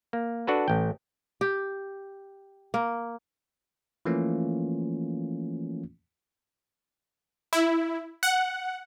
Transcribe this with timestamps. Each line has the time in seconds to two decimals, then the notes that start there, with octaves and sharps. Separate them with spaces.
0.13 A#3
0.47 D4 F#4 A4 B4
0.68 A1 G5
1.41 G4
2.74 A#3
4.05 E3 F3 A3 A#3 C#4 F4
7.53 E4
8.23 F#5